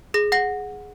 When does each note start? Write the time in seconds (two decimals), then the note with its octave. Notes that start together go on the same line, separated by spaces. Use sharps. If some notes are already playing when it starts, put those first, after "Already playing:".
0.14 G#4 A#6
0.32 F#5 A#6